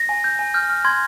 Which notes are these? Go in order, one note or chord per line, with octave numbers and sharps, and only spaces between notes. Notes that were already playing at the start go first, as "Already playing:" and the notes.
Already playing: A#6
G#5
G6
G#5
F6 G6
F6
C6 G#6